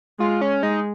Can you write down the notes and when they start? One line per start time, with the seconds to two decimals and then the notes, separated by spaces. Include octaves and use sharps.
0.19 G#3 F4
0.41 C#4
0.63 G#3 D#4